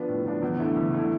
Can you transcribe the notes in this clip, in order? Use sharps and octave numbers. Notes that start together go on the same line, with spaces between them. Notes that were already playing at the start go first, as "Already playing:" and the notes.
Already playing: F3 B3 D4
A2
F3 B3 D4
E2
D3 A3 E4
E2
D3 A3 E4